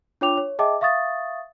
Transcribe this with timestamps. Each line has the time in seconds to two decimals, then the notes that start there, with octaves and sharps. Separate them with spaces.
0.21 D4 F4 C#5 G5 D6 F7
0.37 C#5
0.59 G#4 D#5 E5 G5 A5 D6
0.81 E5 F5 C#6 D#6 A6